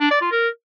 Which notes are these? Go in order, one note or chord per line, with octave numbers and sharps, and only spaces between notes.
D4
D5
F4
A#4